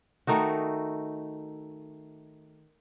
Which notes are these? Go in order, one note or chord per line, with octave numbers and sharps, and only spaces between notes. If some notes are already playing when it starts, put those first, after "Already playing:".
D#3 A3 D#4 F#4